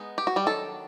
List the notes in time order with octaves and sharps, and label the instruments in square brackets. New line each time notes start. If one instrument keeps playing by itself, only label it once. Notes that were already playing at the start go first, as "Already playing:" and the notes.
Already playing: [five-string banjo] G#3 B3 D#4
G4
F#4
G3 G4
D#3 F#3 D4 A4